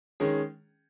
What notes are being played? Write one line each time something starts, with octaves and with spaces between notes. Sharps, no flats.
D#3 G#3 C#4 G#4